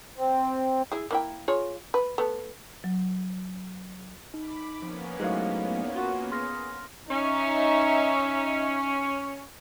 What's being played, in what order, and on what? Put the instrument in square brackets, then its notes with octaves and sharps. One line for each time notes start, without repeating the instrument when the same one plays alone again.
[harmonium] C4
[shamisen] E4 G#4
A#3 E4 G5
F4 G#4 C#5
B4
A3 B3
[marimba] F#3
[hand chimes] D#4 [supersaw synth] B5 D6
[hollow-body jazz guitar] F2 [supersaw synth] A#3 B3 C#4
[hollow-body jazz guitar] A2 F#3 G#3 [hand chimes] D#4 C5 F5
[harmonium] E2
[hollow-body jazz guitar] F4 [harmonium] F#4
[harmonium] G#4 [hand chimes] C6 F6 A#6
[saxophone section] C#4 [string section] D#4 E5